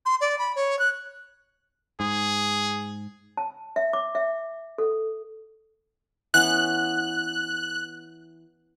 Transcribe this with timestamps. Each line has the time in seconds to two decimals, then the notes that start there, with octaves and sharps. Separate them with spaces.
0.06 C6
0.21 D5
0.39 B5
0.56 C#5
0.79 F#6
2.00 G#2 G#4
3.37 A5
3.76 E5
3.93 D6
4.15 E5
4.78 A4
6.34 E3 B3 C#4 F#6